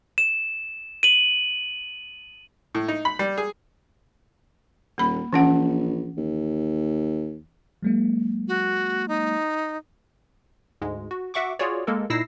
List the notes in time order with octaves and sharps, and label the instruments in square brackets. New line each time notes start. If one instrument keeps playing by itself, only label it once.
[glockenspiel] E7
D#7 F#7
[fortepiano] A2
D#4
B5
G3
G#4
[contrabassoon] D#1 [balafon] A#3 B5
[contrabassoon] A#1 [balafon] E3 C#4 F#5
[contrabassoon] D#2
[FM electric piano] F#3 G#3 A#3
[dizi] F#4
D#4
[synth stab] D2 G#2 G#3
F#4
F#4 E5 F#5 C#6 D6
F4 F#4 G#4 C#5 D5
G#3 A#3 A4 A#4
A#2 D#4 E4 E6 A#6 C7